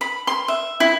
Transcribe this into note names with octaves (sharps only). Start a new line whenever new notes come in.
B5
C6
E5
E4